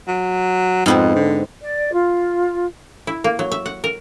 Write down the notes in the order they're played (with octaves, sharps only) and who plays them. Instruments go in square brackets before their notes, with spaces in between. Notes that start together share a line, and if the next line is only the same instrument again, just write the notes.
[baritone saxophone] F#3
[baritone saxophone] F2 [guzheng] G#2 B3 C4
[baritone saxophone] D3
[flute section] D5
F4
[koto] E4
A#3
F#3
E5
F#5
A#4